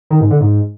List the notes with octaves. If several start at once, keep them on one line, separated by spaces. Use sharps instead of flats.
D#3
G#2
D3
G#2